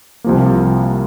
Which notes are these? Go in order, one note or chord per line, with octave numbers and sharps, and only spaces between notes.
C2 C3 F3 A#3